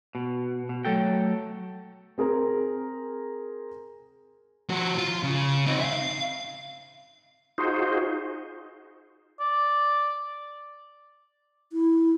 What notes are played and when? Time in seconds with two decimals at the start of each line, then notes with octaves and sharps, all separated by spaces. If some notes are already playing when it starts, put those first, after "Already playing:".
0.15 B2
0.69 B2
0.85 F#3 A3 A4 G5
2.18 C4 G#4 A#4
4.70 F3 F#4
4.98 F4
5.23 C#3
5.66 C4 D#4
5.81 E5 F5
5.93 F5
7.58 D#4 F4 F#4 G#4 C5
9.40 D5
11.72 E4